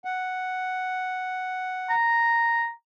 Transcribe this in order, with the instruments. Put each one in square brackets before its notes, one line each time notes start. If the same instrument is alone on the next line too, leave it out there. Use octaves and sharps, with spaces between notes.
[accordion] F#5
[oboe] A#5